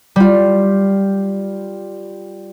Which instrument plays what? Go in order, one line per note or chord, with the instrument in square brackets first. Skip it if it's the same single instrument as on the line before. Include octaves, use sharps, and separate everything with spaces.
[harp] G3 F4